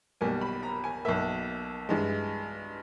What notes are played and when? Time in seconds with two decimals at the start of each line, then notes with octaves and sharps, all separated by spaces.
0.21 B1 B2 G3 A#3 G#5
0.41 B5
0.63 A#5
0.84 G#5
1.05 B1 B2 A#3 E5
1.89 G2 E3 G#3